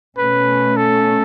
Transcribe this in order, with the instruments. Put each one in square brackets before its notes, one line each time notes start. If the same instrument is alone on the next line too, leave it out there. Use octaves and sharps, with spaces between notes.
[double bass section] B2 A3 C#4 [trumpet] B4
[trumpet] A4